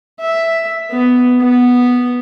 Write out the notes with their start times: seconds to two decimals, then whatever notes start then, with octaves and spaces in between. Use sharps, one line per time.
0.21 E5
0.92 B3
1.41 B3